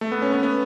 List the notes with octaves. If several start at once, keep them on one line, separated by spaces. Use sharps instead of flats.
A3
B3
C#4
B3
B3